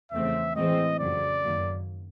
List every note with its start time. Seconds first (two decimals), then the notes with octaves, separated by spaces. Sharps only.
0.11 E2 C#3 F3 A3 C4 E5
0.55 A2 E3 G#3 C4 D#5
1.00 F2 C#3 F#3 D5
1.44 F#2 D#3 F#3 A#3